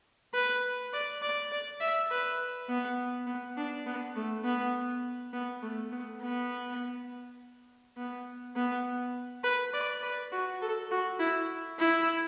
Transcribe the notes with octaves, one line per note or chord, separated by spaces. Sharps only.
B4
D5
D5
D5
E5
B4
B3
B3
D4
B3
A3
B3
B3
A3
B3
B3
B3
B3
B4
D5
B4
F#4
A4
F#4
E4
E4